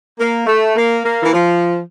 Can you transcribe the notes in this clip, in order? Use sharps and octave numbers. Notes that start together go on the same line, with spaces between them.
A#3
A3
A#3
A#3
E3
F3